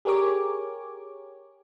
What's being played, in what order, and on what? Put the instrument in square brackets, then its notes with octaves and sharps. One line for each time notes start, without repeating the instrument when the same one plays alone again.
[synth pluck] G4 G#4 A#4 C#5 D6